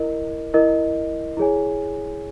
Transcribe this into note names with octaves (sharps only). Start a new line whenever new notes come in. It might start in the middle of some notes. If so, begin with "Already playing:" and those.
Already playing: E4 A#4 D#5
E4 A#4 D#5
E4 G#4 C#5 G#5